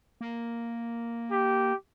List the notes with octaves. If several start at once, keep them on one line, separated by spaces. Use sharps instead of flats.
A#3
G4